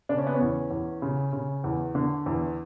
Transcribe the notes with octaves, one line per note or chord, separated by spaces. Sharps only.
C#3 D4
C#4
B3
C#4
E2
E2
C#3
C#3
E2
D3
E2